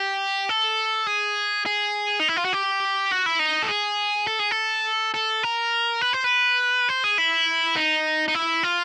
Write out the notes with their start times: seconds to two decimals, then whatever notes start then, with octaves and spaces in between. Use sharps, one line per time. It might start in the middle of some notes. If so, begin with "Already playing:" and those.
Already playing: G4
0.49 A4
1.07 G#4
1.66 G#4
2.20 D#4
2.28 E4
2.36 F4
2.45 F#4
2.53 G4
3.11 F#4
3.26 E4
3.39 D#4
3.62 A4
3.69 G#4
4.27 A4
4.39 G#4
4.51 A4
5.14 A4
5.43 A#4
6.01 B4
6.13 C5
6.24 B4
6.89 C5
7.04 G#4
7.18 E4
7.76 D#4
8.28 D#4
8.35 E4
8.63 F4